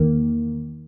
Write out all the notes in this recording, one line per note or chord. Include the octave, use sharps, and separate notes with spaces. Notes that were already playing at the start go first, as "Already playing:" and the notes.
Already playing: E2 D#3 A#3